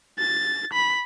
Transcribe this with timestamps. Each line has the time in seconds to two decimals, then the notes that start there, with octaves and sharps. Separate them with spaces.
0.19 A6
0.73 B5